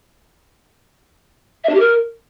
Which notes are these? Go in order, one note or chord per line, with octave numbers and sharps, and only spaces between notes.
E5
D4
G4
A#4